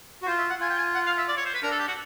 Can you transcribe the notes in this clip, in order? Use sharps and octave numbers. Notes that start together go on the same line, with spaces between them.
F#4
F4 C5
E5
F#5
F4 G#5
G5
G#5
F#5
F5
E5
D5
C#5
C5
B4
D4 A#4
A4
G4
F#4